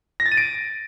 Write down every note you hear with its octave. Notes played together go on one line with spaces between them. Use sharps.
A#6
A6
D#7
D7